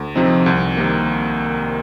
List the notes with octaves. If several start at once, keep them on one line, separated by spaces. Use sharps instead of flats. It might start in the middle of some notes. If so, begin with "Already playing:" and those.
Already playing: D2
C3 F3 C4 D#4
C2
C3 D#3 A#3